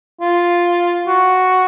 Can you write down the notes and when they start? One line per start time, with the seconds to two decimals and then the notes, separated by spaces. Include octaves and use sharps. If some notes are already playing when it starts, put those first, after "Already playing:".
0.21 F4
1.07 F#4